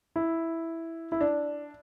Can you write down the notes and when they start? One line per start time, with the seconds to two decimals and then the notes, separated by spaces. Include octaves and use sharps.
0.16 E4
1.12 E4
1.21 D4